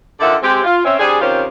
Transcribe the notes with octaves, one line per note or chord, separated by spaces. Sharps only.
D3 D#3 F4 D5 E5 F#5
G#3 C4 G4
F4
C4 C#4 E5
G3 C4 D4 G#4
C3 D#3 C#4 F4 C5